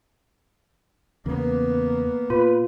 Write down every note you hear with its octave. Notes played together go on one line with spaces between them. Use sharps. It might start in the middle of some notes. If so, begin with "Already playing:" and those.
E2 C#3 A#3 B3
A#2 F4 B4